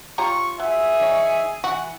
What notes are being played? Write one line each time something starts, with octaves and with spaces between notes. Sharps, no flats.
F4 G4 C#5 F5 A#5 C#6
F#3 G#4 E5
E3 D#4 C#5
E3 F#4 F#5